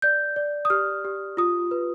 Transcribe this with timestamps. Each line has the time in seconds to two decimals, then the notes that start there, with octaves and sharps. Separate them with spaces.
0.02 D5 G6
0.36 D5
0.65 D#6
0.70 G4 F6
1.05 G4
1.37 F4 D#6
1.71 B4